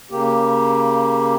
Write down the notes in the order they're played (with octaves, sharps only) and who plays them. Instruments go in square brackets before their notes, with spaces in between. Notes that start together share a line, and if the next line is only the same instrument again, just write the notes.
[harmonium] C#3 A#3 G4